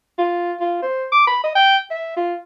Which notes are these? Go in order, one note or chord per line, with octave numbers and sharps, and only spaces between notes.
F4
F4
C5
D6
B5
D#5
G5
E5
F4